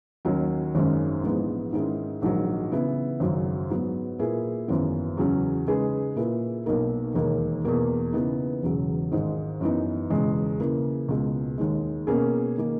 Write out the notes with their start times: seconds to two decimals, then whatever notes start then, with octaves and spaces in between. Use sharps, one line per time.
0.25 D#2 D#3 F#3 C#4
0.75 G#1 F#2 D#3 G#3 C#4
1.23 A#1 G#2 E3 G#3 B3
1.73 G#2 D#3 G#3 C#4 E4
2.22 A#1 G#2 D#3 F#3
2.72 C#3 E3 B3 E4
3.20 G#1 F#2 C#3 F#3
3.70 G#2 F#3 B3
4.19 A#2 A#3 E4 G#4 B4
4.68 G#1 F#2 E3 B3
5.17 E2 C#3 F#3 C#4
5.67 C#3 G#3 D#4 G#4 B4
6.16 A#2 A#3 E4 G#4 B4
6.66 B1 B2 A#3 D#4 A#4
7.14 E1 D#2 D#3 A#3
7.65 E2 B2 A#3
8.13 C#3 E3 B3 D#4
8.62 E1 E2 C#3 F#3
9.12 G#1 G#2 D#3 G#3
9.61 F#2 E3 B3 D#4
10.10 E1 E2 C#3 G#3
10.60 C#3 E3 A#3
11.09 C#2 B2 G#3
11.58 D#2 D#3 G#3
12.07 B2 A#3 C#4 G#4
12.58 D#3 A#3